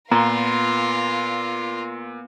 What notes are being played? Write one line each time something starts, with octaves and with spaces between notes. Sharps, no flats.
A#2 B3 F4 A#4 A#5 C6